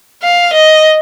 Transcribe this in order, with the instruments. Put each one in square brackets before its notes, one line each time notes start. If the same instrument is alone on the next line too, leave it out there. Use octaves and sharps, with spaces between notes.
[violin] F5
D#5